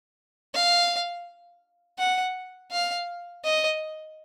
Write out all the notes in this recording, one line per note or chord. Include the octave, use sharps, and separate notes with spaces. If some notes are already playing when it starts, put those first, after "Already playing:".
F5
F#5
F5
D#5